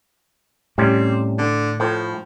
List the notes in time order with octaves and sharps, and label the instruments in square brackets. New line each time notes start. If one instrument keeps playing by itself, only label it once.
[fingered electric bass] A2 [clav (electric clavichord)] C3 G3 C#4 [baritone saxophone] C4
[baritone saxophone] D3
[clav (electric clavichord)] A2 [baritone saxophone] F3